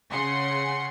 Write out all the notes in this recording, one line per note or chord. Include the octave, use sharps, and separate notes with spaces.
C#3 G#4 F#5 C6 C#7